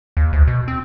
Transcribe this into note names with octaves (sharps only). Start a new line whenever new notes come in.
D#2
D2
B2
C4